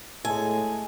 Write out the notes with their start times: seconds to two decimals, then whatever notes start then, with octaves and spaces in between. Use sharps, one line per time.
0.25 A2 G#3 A4 G#5